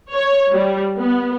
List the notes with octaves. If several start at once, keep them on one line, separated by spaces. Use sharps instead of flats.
C#5
G3
B3